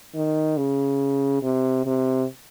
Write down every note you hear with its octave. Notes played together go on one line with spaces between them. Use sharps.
D#3
C#3
C3
C3